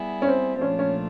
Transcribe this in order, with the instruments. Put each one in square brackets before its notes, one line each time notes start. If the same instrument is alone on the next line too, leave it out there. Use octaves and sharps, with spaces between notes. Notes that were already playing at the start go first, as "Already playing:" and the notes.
Already playing: [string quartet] G3 B3 E4 G#4
[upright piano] C#4
C4
C4
[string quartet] A#2 F3 A3 D4 F4 [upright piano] C#4
[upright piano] C#4